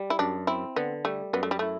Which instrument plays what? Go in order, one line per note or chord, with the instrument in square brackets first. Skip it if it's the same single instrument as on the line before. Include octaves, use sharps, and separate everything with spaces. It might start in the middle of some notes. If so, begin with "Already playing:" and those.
Already playing: [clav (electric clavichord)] G3
[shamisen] E4
[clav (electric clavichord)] F#2 [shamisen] D4
[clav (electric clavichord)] C4 [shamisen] E4
[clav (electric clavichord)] D3 [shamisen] B3
[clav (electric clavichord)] G3 [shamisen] A3
[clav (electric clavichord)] F#2 [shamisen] B3
[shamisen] A3
G3
[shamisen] A3 [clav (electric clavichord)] E4